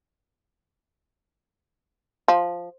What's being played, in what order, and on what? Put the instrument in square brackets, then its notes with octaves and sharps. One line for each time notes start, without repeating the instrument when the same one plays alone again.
[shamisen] F3